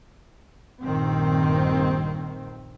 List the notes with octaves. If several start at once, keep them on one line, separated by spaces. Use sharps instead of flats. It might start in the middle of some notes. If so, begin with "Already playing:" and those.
A#1 G2 D#3 C4